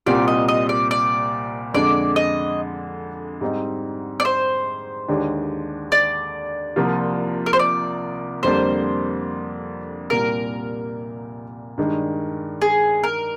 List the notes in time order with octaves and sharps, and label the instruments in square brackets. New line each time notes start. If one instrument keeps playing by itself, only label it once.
[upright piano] C2 A#2 G3 C4 F4 [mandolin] D5
[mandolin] D#5
D#5
D5
D5
[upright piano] F2 D3 G#3 D4 [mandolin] D5
[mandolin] D#5
[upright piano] G#2 G3 C4 D#4
[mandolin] D5
C5
[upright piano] D#2 D3 G#3 D4 G4
[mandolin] D5
[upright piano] C2 C3 F3 A#3 F4
[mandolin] A#4
C5
D5
[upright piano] F2 D3 G3 A#3 D4 [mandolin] C5
[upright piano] C2 A#2 G3 A#3 [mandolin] A#4
[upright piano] G2 D#3 G#3 D4
[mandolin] G#4
A#4